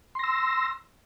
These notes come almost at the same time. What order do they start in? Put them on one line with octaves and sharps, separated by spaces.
C6 A#6 E6